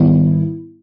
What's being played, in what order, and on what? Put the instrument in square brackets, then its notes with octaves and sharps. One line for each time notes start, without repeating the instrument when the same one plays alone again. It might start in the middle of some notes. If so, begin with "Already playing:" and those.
Already playing: [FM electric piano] G#2 D#3 G3 B3 E4